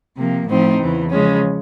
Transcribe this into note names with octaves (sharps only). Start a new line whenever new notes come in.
C3 F3 A#3
A2 F3 A3 C4 D#4
E2 C#3 E3
C#3 F3 G#3 C#4